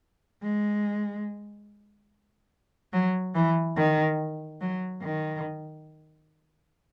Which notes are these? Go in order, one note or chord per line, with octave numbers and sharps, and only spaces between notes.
G#3
F#3
E3
D#3
F#3
D#3